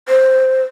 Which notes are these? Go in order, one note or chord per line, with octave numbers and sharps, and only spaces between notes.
C5